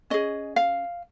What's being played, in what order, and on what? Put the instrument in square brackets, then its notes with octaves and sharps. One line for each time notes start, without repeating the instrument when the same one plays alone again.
[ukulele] C#4 G#4 D#5
F5